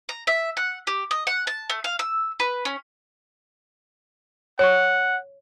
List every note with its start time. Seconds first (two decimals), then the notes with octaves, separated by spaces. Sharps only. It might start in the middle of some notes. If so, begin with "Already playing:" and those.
0.09 A#5
0.27 E5
0.57 F#5
0.87 G4
1.11 D#5
1.27 F#5
1.47 A5
1.70 A3
1.84 F5
1.99 E6
2.40 B4
2.65 C#4
4.59 C#5 F#5 C#6